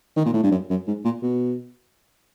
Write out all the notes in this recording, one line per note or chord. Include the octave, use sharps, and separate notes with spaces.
D#3
A#2
A2
G2
F#2
F#2
G#2
A#2
B2